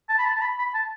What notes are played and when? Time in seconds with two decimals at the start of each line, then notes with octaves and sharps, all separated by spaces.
0.09 A5
0.18 B5
0.25 A5
0.36 A5
0.41 B5
0.58 B5
0.74 A5